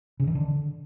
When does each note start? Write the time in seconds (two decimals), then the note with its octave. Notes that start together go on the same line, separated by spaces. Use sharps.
0.20 C#3
0.27 D#3
0.35 D3